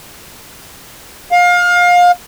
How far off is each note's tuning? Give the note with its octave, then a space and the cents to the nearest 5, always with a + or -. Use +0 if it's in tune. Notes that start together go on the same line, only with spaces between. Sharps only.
F5 +25